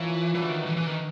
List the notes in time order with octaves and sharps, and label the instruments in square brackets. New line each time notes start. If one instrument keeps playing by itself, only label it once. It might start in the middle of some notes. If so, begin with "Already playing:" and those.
Already playing: [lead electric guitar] E3 [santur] F3 A#3 C#4 F4 A#4
[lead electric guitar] E3 [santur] A3 D4 F#4 B4
[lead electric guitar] D#3
E3
E3
D#3